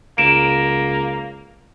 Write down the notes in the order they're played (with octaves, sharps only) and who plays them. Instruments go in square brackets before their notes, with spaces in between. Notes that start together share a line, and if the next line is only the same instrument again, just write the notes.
[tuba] C#2 [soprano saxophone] A#3 [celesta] D7 E7